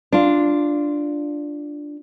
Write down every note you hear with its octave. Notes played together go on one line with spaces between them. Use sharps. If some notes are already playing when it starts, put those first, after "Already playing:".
D4 F4